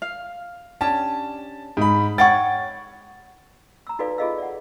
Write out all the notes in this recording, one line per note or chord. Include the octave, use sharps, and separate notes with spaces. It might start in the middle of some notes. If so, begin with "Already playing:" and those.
F5
C#4 D4 G4 A5
G#2 B5
C#5 F#5 G5 C#6 A6
A#5 E6
D#4 F#4 A4 B4 D5 F5
F4 G#4 A4 D#5 F5 E6
D5 F#5